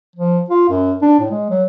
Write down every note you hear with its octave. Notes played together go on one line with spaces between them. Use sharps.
F3
F4
F#2
D4
A2
G#3
F#3